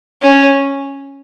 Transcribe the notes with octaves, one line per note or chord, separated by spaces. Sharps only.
C#4